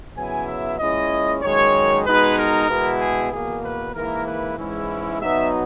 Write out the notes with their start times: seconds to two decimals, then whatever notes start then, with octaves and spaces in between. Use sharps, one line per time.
0.17 C#3 F#3 B3 E4 G#5
0.48 E5
0.79 A#2 G#3 C#4 E4 D#5
1.42 F#2 D#3 G#3 C#5
2.06 B2 G#3 D#4 B4
2.37 A#4
2.68 B2 G#3 B3 E4
3.00 G#4
3.31 E2 B2 A#3 G#4
3.63 B4
3.94 G#2 E3 A#3 E4 A#4
4.26 B4
4.57 G#2 E3 G#3 C#4 E4
5.20 B2 F#3 B3 D#4 E5